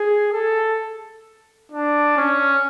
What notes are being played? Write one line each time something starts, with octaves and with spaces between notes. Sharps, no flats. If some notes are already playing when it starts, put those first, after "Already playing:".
Already playing: G#4
A4
D4
C#4